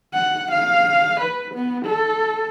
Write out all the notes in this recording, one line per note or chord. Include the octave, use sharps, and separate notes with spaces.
F#5
F5
B4
B3
A4